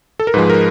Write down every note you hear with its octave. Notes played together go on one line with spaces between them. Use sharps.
A4
A#4
G#2 F3 G#3 B4
A#4